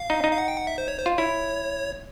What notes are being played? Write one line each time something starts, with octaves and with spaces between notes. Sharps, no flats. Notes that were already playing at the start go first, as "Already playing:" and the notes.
Already playing: F5
D#4
D#4
F5
F#5
G5
F#5
E5
C5
C#5
C5
F4
E4 C#5